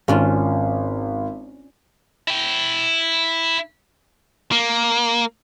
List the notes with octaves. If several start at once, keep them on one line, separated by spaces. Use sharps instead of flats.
G#1 C#4 D4 F4
E4 G5
A#3